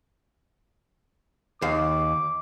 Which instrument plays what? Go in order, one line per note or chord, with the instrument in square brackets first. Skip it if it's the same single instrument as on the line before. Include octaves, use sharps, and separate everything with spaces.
[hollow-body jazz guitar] D#2 F5 [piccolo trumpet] D6